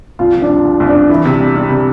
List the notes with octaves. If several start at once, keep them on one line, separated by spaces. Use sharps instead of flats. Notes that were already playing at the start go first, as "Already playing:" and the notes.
C2 F4
F3
D4
C2
C2
C2
D4
C2
E3 E4
C3
G3
G3
C3